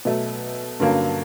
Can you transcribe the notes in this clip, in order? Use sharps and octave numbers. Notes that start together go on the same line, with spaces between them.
B2 F#3 A3
G2 D3 F#3 A#3 C#4